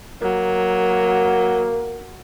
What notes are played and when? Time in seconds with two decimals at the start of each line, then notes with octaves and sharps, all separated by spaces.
0.22 F#3 A#3